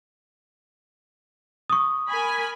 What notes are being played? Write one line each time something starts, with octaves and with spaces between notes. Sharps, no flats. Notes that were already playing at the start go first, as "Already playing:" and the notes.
C#6 D#6
A#4 G#5 B5